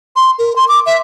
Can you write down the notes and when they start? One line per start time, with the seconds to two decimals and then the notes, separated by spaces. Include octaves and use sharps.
0.16 C6
0.39 A#4
0.56 C6
0.69 D6
0.86 E5